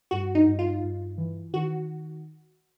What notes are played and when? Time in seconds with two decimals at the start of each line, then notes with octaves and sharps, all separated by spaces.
0.11 G2 F#4
0.35 D#4
0.46 G2
0.59 F4
0.83 G2
1.17 E3
1.53 D#3 F#4